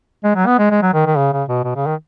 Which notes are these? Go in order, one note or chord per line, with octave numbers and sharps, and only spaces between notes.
G#3
F#3
B3
G#3
G#3
F#3
D#3
D#3
C#3
C#3
B2
B2
C#3
D#3